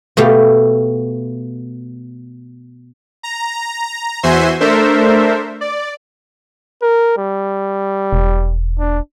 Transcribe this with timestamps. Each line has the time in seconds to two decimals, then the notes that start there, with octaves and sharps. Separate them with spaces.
0.17 B2 A3 G4 F5
3.23 A#5
4.23 E2 F#4 C5 E5 G#5 C6
4.60 A3 D4 A4 A#4 C5 E5
5.61 D5
6.82 A#4
7.18 G3
8.13 E1
8.79 D4